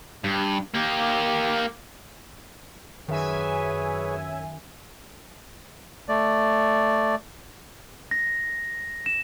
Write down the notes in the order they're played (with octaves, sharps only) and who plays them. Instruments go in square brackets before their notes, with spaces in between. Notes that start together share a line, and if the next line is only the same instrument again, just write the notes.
[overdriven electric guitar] G2
A#3 G4
[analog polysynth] F#2 E5 G#5 [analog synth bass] D#3 [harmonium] G#4 B4 C#5
[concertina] A3 D5
[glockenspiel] A#6
E7